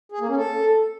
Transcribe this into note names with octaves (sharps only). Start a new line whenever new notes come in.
G#4
A#3
C#4
A4